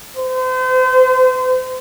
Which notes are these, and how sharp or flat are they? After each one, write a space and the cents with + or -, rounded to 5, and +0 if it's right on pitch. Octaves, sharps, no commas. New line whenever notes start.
C5 -35